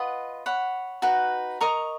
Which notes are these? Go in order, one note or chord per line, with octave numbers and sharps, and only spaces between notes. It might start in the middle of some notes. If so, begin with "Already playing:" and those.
Already playing: F4 B4 D#5 F#5
C#5 F#5 B5
D#4 F#4 B4
A#4 D#5 A#5 C#6